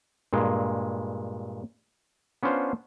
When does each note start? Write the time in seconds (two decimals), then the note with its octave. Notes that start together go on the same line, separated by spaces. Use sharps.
0.33 G2 A#2 G#3
2.43 B3 C#4 D4 F4 C5